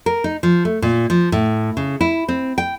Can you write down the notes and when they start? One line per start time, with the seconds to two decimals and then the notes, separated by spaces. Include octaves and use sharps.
0.06 A#4
0.24 D#4
0.43 F3
0.65 A3
0.82 A#2
1.10 F3
1.32 A2
1.77 C#3
2.01 E4
2.28 C4
2.58 G5